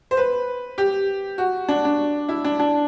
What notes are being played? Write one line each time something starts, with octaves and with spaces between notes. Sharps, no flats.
C5
B4
G4
F#4
D4
D4
E4
D4
D4